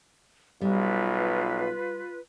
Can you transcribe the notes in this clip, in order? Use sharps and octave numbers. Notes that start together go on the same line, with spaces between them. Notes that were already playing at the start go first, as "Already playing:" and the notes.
B1 G3 F4 B4